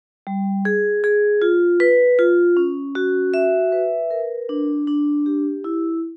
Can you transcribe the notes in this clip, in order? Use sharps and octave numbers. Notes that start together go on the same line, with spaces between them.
G3
G#4
G#4
F4
B4
F4
C#4
F#4
E5
B4
A#4
D4
D4
G4
E4